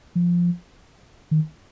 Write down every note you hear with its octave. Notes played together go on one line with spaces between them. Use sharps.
F3
D#3